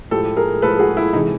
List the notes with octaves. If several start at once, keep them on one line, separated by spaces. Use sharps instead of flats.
A2 F3 G#3 G4 A4
G#4 A#4
A2 F3 G#3 A4 B4
F#4 G#4
E4
C3 E3 G#3 D#4